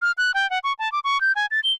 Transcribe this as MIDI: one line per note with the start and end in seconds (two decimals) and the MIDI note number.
0.02 0.12 89
0.18 0.32 90
0.34 0.49 79
0.50 0.59 78
0.64 0.73 85
0.79 0.91 81
0.92 1.00 86
1.04 1.21 85
1.21 1.32 91
1.36 1.46 80
1.51 1.60 93
1.64 1.72 103